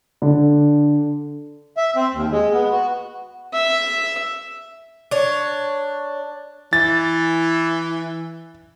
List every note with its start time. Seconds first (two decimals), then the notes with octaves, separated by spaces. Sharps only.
0.22 D3
1.77 E5
1.96 C4
2.14 D#2
2.32 G#3
2.53 B3
2.72 F#4
3.53 E5
5.11 D4 C#5
6.73 E3 A6